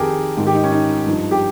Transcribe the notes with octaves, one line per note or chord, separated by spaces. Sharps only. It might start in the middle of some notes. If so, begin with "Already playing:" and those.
Already playing: F2 D#3 G4 G#4 A#4
G#2 D#3
G4
D#4
C#4
D#4
G2 F3
G4